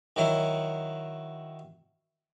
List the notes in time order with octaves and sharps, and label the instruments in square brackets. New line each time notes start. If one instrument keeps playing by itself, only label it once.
[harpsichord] D#3 F#3 E4